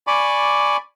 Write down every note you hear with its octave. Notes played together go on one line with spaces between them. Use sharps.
D5 G#5 B5 C#6 D6